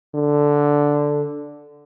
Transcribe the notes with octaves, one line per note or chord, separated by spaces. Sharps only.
D3